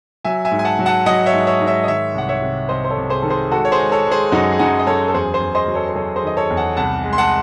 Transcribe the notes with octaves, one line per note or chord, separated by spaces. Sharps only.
F#3 E5 G#5
E5 G#5
G#2
G#5
F#5 A5
F#3
F#5 A5
F#3 D#5 F#5
C#5 E5
G#2
C#5 E5
G#2
C#5 E5
D#5
D#3 C#5 E5
C2 F#5
C#5 E5
C3
C2 C5 D#5
C5
A4 C#5
C2
G#4 C5
D#3 A4
G#4 C5
G#3 F#4 A4
C#5
G#4 C5
G#3
A4 C#5
G#3
G#4 C5
F#2 D#4 F#4
G#4
F#2 D#4 F#4
D#5
F#2 A4 C#5
A4
E2 G#4 C5
G#4 C5
E2
C5 D#5
F#3
A4 C#5
C5
F#3 A4 C#5
G#4 C5
D#3 D#5
A4 C#5
E2
F#5 A5
C2 F#5 A5
G#3
C6
F#5 A5